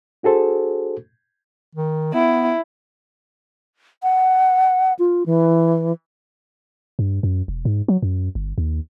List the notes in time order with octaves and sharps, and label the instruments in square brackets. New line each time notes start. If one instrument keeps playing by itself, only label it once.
[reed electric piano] D4 F#4 G#4 A4 C5
[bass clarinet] D#3
[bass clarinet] B3 [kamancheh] E4
[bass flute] F#5
F4
E3
[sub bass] G2
F#2
E1
G#2
F#3
F#2
G1
D#2